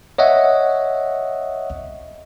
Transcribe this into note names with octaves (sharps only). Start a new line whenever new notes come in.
C#5 D#5 E5 F#5